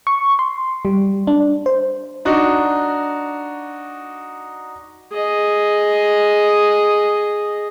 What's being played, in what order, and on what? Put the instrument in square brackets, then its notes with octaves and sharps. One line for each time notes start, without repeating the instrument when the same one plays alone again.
[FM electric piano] C#6
C6
G3
D4
C5
[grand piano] D4 D#4 F#4
[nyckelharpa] G#4 D#5